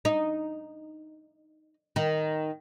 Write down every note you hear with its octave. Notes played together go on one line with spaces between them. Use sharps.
D#4
D#3